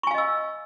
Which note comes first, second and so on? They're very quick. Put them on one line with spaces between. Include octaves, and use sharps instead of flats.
C#6 G#5 F5 D#5 E6